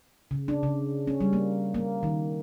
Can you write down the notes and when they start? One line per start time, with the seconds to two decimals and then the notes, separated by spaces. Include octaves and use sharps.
0.31 C#3
0.48 D4
0.63 C#3
1.08 C#4
1.20 G3
1.33 A#3
1.74 A#3
2.03 D#3